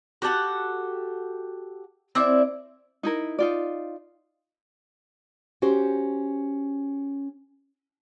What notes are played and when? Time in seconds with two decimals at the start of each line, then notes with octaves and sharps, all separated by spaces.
0.22 F#4 G4 A4 F#5
2.15 C4 E4 D5 E5
3.03 D#4 E4 A#4
3.39 D#4 F4 D5
5.62 C#4 F#4 G4 C5